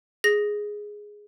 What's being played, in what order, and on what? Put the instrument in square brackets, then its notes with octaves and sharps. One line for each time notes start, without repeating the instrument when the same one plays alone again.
[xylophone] G#4 A#6